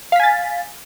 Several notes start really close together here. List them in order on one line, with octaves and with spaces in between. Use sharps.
F5 B6 G#5 A6